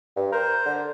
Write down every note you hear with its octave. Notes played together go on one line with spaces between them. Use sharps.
G2
A#4 C5
D3